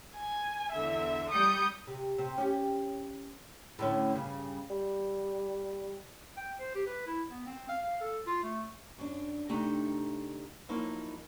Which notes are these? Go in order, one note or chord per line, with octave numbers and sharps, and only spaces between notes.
G#5
E2 D3 E5
G3 D#6 G6 C#7
C3
C3
C#4 G4
A2 D3 C#4
G2 C#3
G3
G5
C5
G4
B4
E4
B3
C4
F5
F5
A4
F4
A3
F#2 D4
C3 A3 D4 D#4 G5 A#5
F3 F#3 A#3 D#4 E4